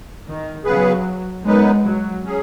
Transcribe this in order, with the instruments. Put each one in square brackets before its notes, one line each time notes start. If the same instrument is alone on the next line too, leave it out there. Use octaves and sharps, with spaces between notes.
[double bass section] D#3
[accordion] C#3 B3 G#4 B4 [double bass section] F#3
[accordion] F#2 F#3 B3 D#4 B4 [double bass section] G#3
[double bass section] F#3
[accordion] F#3 C#4 G#4